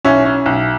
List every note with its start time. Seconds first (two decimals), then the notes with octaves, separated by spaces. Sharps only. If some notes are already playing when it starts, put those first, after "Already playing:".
0.05 B1 C#4 E4
0.25 C#4
0.46 B1